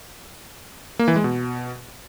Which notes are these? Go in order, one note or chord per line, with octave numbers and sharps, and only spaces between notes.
A#3
E3
G#3
B2